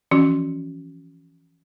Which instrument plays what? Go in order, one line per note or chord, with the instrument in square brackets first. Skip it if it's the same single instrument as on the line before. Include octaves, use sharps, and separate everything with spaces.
[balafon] E3 F3 C#4 F#4